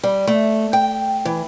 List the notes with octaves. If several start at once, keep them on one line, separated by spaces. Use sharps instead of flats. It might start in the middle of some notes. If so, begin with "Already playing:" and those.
G3
A3
G5
E3